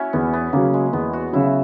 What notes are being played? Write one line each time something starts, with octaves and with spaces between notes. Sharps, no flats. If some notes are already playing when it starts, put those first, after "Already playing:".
Already playing: C#4 E4 F#4
E2 B3
B3
C#3 F#3 A#3
G#3
E2 B3
F#4
C#3 F#3 E4